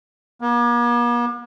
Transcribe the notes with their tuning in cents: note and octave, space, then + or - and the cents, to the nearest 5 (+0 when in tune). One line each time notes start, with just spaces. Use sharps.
A#3 +45